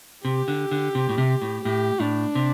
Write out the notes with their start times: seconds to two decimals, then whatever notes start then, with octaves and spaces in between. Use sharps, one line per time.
0.24 C3 G4
0.48 D3
0.71 D3
0.95 C3
1.09 A2
1.18 C3
1.42 A2
1.65 A2 G4
2.00 A2 D4
2.35 C3